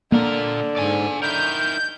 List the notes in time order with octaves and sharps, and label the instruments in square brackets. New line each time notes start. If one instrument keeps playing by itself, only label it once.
[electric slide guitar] A#2 A#4 [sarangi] D3 [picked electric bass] A#3
[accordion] G#2 [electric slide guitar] D5 G#5
[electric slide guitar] D#4 E4 A#4 [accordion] G6